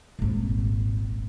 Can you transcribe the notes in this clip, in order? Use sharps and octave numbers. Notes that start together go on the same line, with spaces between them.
D#1 G#1